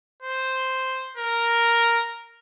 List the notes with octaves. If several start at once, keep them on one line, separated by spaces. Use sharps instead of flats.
C5
A#4